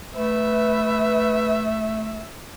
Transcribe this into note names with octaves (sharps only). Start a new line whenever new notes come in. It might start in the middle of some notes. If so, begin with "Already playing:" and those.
A3 B4 E5